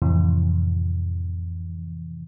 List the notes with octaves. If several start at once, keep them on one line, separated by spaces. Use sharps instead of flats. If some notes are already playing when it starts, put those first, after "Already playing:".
F2 A2 C3 E3